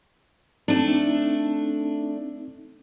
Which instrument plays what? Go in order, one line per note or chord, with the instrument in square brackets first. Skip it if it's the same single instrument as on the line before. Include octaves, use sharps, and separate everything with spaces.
[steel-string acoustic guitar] A3 D4 [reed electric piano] C4 D#4